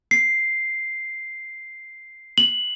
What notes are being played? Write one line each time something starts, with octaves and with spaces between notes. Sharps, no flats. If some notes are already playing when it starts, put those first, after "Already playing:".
C7
F#7